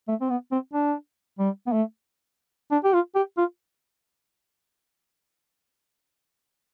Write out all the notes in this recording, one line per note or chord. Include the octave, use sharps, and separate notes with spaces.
A3
C4
B3
C4
D4
G3
B3
A3
D4
G4
F4
G4
F4